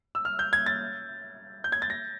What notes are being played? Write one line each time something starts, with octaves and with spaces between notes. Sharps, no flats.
E6
F6
G6
G#6
A6
G6
G#6
A6
A#6